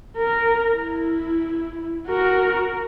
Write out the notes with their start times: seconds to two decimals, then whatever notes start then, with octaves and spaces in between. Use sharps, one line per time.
0.17 A#4
0.74 E4
2.07 F#4 A#4